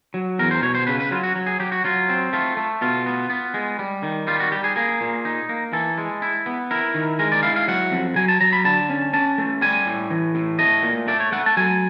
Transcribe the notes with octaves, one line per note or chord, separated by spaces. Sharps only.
F#3
E2 A#4
C5
B2 C#5
C5
C#3 B4
B4
F#3 F4
F#4
F#3
G#4
F#3 G4
F#4
F#3 F4
C4
A3 F4
A3
B2 F4
B3
B3
G#3
G3
D#3
G3 F4
F#4
G3 G4
G#4
A#3 G#4
A#2
D#4
A#3
E3 A4
G#3
E4
B3
E4 A#4
D#3
G#3 A#4
D5
E4 F5
F5
F#3 F#5
F2
F#3 G#5
A5
F#3 A#5
B5
D3 A5
C#4
C#4 A5
A3
G3 G#5
A2
E3
A2
A3 D#5
A#2
A3 D5
C#5
A3 F#5
A5
F#3 G#5